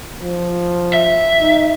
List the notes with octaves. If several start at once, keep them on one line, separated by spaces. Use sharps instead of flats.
F3
E5
D#4